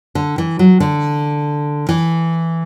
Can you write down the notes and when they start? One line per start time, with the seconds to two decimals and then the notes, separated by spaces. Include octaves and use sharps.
0.15 D3
0.38 E3
0.59 F#3
0.80 D3
1.89 E3